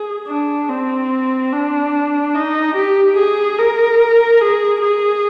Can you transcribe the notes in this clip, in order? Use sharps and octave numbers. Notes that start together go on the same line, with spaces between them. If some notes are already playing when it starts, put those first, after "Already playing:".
Already playing: G#4
D4
C4
D4
D#4
G4
G#4
A#4
G#4
G#4